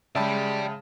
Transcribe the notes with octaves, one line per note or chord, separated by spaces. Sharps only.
C#3 G#3 G4 D5 E5 G5 A5 B5